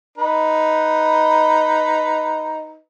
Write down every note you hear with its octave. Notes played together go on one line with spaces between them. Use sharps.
D#4 B4